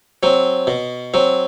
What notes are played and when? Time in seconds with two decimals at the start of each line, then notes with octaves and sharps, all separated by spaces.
0.23 F#3 C4
0.67 B2
1.14 F#3 C4